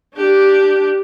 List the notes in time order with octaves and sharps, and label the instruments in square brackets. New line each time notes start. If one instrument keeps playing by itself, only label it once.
[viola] D4 G4